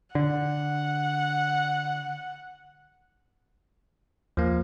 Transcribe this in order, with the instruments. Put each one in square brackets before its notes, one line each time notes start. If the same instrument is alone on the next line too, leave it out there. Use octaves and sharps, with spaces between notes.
[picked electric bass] D3 [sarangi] F#5
[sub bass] D#2 [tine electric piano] F3 A#3